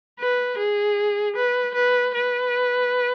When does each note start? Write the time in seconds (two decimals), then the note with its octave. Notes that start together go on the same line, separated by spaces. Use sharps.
0.20 B4
0.58 G#4
1.36 B4
1.75 B4
2.15 B4